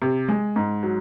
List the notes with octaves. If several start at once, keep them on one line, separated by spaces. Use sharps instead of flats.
C3
G#3
G#2
F#3